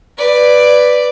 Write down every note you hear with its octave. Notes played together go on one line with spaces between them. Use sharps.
B4 D5